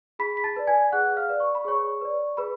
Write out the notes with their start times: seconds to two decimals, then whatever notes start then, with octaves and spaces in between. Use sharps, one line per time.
0.19 G#4 B5 B6
0.37 B6
0.44 A5 A6
0.56 B4 D5
0.67 G#5 G#6
0.92 G#4 F#5 F#6
1.17 F5 F6
1.29 B4 D5
1.40 C#6
1.55 B5
1.65 G#4 C#5 C#6
2.01 B4 D5
2.37 G#4 B4 B5